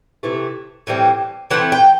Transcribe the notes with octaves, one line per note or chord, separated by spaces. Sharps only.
C3 E3 A3
A2 E3 G3 C4
E3 A3 C4 F#5
G5